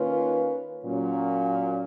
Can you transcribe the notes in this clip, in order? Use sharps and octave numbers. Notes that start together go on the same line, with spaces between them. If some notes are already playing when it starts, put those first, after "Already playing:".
Already playing: D#3 A#3 C#4 F4 B4
A#2 F#3 C#4